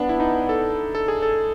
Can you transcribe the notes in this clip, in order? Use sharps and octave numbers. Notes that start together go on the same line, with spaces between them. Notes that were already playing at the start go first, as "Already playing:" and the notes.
Already playing: B3 D4
E4
D#4
A4
A4
G#4
A4